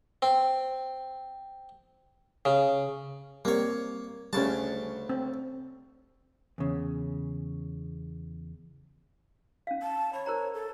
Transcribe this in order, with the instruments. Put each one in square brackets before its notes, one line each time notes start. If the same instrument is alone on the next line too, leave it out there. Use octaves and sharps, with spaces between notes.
[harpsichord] C4
C#3
[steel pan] G3 C4 [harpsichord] A#3 C#5
[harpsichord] D2 C#3 A5 [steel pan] G3 C#4
[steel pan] C4
[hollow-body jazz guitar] E2 C#3
[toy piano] C#4 F5
[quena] A5
[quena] C#5 [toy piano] B5
[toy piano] A#4 C5 A#5
[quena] A4